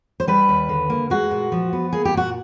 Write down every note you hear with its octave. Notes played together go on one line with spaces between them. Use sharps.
C5
G3 B4
D#2
D3
A#3
G#3 F#4
A#2
F3
B3
A#3 G#4
G4
A#2 F#4